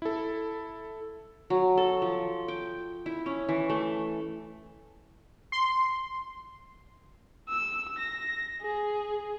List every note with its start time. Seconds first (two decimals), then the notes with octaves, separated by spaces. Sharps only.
0.02 E4 A4
1.50 F#3
1.77 A4
2.02 F3
2.48 G5
3.06 E4
3.26 C#4
3.49 E3
3.70 A3
5.52 C6
7.49 E6
7.98 A#6
8.62 G#4